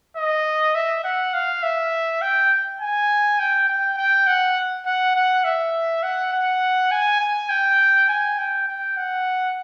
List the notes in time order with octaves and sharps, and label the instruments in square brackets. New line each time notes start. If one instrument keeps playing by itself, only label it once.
[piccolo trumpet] D#5
E5
F#5
F5
E5
G5
G#5
G5
G5
G5
F#5
F#5
F#5
E5
F#5
F#5
G#5
G#5
G5
G#5
G5
G5
F#5